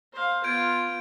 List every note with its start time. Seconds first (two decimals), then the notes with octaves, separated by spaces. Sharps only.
0.13 C5 F5
0.44 B3 F4 G6 G#6 D7